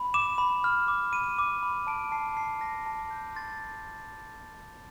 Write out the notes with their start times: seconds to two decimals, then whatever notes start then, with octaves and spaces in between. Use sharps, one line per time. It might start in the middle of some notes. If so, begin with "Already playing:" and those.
Already playing: B5
0.14 D6 E7
0.38 B5
0.64 F6
0.88 D6
1.12 B5 D#7
1.38 D6
1.63 B5
1.87 A5 D7
2.12 A5 C7
2.37 A5 C7
2.61 A5 A#6
2.86 A5
3.11 G6
3.36 C6 A6